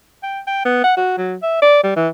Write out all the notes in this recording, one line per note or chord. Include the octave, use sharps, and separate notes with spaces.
G5
G5
B3
F#5
F#4
F#3
E5
D5
G3
E3